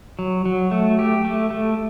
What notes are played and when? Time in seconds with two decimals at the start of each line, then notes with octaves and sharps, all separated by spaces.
0.19 F#3
0.46 F#3
0.71 A3
0.99 G4
1.25 A3
1.50 A3